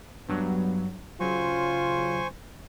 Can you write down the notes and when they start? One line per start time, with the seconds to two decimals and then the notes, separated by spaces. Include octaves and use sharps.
0.29 G2 F#3 B3
1.20 C#3 F#3 F4 C5 G#5 C#6